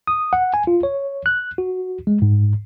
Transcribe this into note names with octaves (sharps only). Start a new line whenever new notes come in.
D#6
F#5
G#5
F4
C#5
F#6
F#4
G#3
G#2